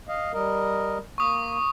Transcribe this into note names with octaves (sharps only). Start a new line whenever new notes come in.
D#5 F5
G3 A#4 D#5
A#3 C#6 D#6